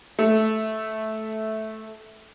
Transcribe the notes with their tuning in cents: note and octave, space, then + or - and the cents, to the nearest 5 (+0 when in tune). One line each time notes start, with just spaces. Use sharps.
A3 -10